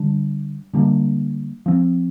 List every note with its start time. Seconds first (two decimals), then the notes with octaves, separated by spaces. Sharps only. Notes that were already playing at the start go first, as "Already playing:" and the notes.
Already playing: D3 G3 D4
0.73 D3 G3 A#3 D4
1.66 F3 C4